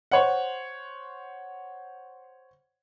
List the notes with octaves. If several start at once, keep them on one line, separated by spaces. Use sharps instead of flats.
C5 C#5 F#5